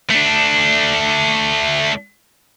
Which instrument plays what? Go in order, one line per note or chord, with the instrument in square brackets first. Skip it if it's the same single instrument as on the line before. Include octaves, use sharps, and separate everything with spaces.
[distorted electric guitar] A3 D4